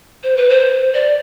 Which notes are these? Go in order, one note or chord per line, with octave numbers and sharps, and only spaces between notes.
C5
B4
C5
D5